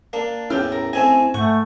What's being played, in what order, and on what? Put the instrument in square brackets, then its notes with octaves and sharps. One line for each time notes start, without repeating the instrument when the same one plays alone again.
[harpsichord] A#3 [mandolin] D4
[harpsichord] E2 A2 [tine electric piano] C#4 E4 [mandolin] G4 G5 F6
[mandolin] A#4
[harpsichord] A3 C4 D#5 [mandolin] G#5
[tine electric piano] G#2 [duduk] A3 [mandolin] F#5 C#6 G6 [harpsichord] G#5